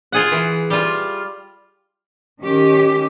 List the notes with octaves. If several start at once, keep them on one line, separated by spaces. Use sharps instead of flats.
F4 G#4 F#5
E3
G3 F4
D#3 C#4 G4